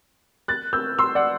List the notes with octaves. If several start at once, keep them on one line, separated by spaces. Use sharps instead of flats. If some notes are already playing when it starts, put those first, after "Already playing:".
F#6 A6
E6 G6
C6 E6
D5 F#5